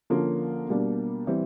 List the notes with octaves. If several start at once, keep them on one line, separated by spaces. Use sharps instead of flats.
D3 F3 A#3 C#4 F4
B2 G3 A#3 D4
E3 G3 C4